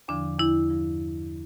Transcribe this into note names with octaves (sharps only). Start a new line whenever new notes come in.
E2 D3 F3 D4
E2 D3 F3 E4
G2 F3